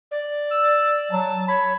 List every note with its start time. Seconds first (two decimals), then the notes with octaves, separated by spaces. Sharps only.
0.11 D5
0.51 E6
1.12 F#3 A5
1.48 C#5 B5